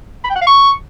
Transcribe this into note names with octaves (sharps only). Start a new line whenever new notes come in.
B5
G5
F#5
F5
C#6